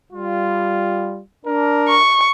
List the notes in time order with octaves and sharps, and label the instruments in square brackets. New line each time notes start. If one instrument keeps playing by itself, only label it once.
[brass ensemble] G3 F4
D4 A#4
[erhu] C#6